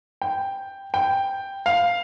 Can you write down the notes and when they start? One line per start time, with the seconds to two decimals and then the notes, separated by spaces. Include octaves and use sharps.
0.22 G5
0.94 G5
1.66 F5